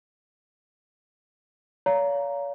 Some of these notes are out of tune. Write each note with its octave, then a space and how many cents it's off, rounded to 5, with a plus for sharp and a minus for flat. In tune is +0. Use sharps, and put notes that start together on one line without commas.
C#5 +40 F5 +0 A#5 +0